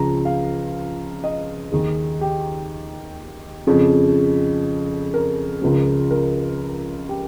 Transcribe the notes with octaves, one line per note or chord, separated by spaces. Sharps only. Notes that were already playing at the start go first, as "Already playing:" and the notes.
Already playing: C#2 C#3 F3 A#5
F5
D#5
D#2 D#3 G#4
G4
F2 C#3 F3
A#4
C#2 C#3 F3
A#4
G4